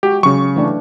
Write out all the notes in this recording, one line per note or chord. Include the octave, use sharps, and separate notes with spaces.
G#3 F#4 G4
C#3 F#3 C#4 C#6
E3 A3 D4